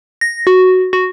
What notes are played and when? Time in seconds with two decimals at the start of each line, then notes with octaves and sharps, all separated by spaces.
0.21 A#6
0.47 F#4
0.93 F#4